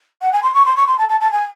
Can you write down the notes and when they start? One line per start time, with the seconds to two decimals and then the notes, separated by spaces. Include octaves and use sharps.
0.22 F#5
0.33 G#5
0.43 C6
0.54 C#6
0.65 C6
0.76 C#6
0.87 C6
0.98 A5
1.09 A5
1.21 A5
1.31 G#5